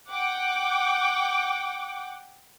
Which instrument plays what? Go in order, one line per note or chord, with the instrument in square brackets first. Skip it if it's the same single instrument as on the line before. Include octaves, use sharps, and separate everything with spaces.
[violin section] F#5 G5 D6